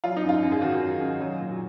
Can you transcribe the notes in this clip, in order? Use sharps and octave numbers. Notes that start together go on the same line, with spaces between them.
F#3 F4
D#4
F#2
F4
F#2
G#4
D#3 F#4
F#2
F#2
F#3
A#2